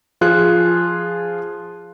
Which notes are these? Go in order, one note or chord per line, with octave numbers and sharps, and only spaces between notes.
F3 F4 G#4 F#6